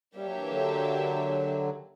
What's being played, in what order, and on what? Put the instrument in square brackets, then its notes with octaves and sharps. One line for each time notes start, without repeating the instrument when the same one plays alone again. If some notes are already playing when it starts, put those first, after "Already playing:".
[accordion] G3 [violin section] A#3 D4 G4 C#5 E5
[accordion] F#3
E3
D3 F#3